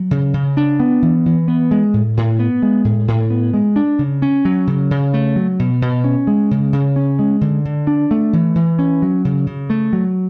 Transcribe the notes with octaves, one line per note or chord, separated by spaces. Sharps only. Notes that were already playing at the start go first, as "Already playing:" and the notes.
Already playing: F#3
C#3
C#3
D4
B3
E3
E3
B3
G#3
A2
A2
B3
G#3
A2
A2
B3
G#3
D4
C#3
C#4
F#3
C#3
C#3
A3
F#3
B2
B2
C#4
G#3
C#3
C#3
C#4
G#3
D3
D3
D4
A3
E3
E3
C#4
F#3
C#3
C#3
A3
F#3